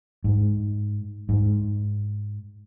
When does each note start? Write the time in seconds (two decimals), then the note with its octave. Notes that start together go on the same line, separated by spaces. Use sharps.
0.24 G#2
1.29 G#2